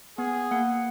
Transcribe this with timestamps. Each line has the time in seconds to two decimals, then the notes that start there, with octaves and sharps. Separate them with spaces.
0.18 B3 G#4
0.51 A#3 F#5 C#7